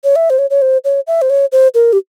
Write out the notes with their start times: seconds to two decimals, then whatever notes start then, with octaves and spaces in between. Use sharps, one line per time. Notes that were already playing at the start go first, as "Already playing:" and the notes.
0.04 C#5
0.16 E5
0.30 C5
0.38 C#5
0.50 C#5
0.62 C5
0.85 C#5
1.07 E5
1.22 C5
1.30 C#5
1.52 C5
1.74 A#4
1.93 G4